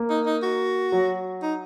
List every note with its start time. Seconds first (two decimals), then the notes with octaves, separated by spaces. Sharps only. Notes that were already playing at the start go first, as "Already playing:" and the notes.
Already playing: A#3
0.09 D#4
0.26 D#4
0.43 F#4
0.92 F#3
1.42 D#4